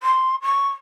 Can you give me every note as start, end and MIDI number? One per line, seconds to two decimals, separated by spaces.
0.03 0.35 84
0.42 0.68 85